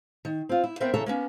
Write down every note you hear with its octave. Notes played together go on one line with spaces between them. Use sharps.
D#3
C4 F4
E4
B3 C4 A#4 C5 E5 G5
C#3 E3 A4 C#5 E5 A#5
A#3 B3 C#4